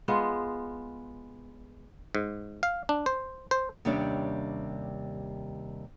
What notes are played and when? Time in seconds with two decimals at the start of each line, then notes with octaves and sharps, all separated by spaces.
0.08 G#3 B3 F4
2.15 G#2
2.63 F5
2.89 D4
3.06 C5
3.51 C5
3.85 D#2 C3 G3 C#4 D4 C#5